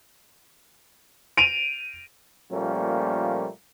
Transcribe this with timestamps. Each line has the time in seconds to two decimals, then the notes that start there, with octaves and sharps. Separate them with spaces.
1.37 D7 D#7 F7
2.51 A#2 F3 G3 A3 A#3 C#4